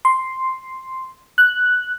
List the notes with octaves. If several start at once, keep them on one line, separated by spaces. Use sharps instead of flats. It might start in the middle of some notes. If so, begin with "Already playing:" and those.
C6
F#6